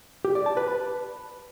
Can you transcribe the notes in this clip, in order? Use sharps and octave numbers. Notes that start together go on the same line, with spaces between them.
G4
D5
A5
B4
B5